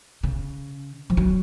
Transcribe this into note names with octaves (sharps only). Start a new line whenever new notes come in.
C#3
F3
F#3